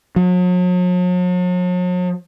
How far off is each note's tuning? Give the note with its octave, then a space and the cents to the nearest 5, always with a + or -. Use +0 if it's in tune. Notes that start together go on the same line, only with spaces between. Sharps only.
F#3 -45